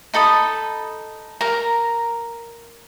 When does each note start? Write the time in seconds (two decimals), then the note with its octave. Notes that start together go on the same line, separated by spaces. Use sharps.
0.14 D#4 A4 B5 D#6
1.41 A#4 A#5